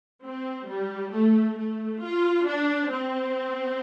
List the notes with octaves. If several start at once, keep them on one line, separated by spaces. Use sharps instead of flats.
C4
G3
A3
A3
F4
D4
C4